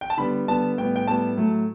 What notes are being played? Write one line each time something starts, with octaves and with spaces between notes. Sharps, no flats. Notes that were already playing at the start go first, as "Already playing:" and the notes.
G5
A5
D3 G3 B3 B5
D3 G3 B3 A5
A2 G3 B3 G5
G5
A2 G3 B3 A5
A2 F#3 A3